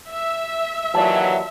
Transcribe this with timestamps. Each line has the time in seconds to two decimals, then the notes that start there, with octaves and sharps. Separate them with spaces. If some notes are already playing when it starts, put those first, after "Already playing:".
0.11 E5
0.95 D#2 E3 F#3 F4 D5 A5